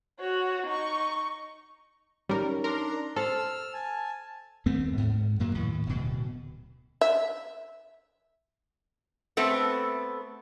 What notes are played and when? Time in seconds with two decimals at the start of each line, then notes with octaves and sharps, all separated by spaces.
0.20 F#4 C#5
0.66 D#4 C#6
2.29 G3 C#4 D#4 A#4
2.64 D4 A#4 A#5 C6
3.16 A4 C5 E6 F6
3.74 G#5 A5
4.66 D#2 A3 B3 C4
4.97 G#2
5.39 F#2 A#2 F#3 A#3
5.55 D#2 A2
5.87 D1 B2
7.01 E5
9.37 A3 B3 C4 A4